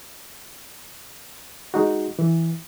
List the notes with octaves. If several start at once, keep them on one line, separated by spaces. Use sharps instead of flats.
G#3 D#4 F#4
E3